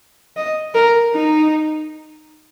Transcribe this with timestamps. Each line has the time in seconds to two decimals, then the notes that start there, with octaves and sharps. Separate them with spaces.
0.37 D#5
0.75 A#4
1.14 D#4